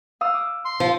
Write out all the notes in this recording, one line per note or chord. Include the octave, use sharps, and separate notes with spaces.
F5 D#6 E6
D6
C6
F3